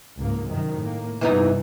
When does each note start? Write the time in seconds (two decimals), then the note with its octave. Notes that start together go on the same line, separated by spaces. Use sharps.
0.18 C#2 G#2 A#3
0.49 F#2 C3 D#3
0.81 A2 A#3
1.21 G2 C3 E3 B3 D#4